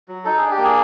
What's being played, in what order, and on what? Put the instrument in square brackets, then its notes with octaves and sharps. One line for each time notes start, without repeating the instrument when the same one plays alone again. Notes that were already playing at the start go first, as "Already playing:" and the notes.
[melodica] F#3
D#4 A4
D4 G#4
G4
A#3
G#4